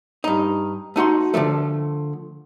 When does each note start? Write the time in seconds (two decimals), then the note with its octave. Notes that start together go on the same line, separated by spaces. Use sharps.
0.24 G2 D#4
0.96 A3 D#4 F#4 C6
1.34 D3 E3 F3 A3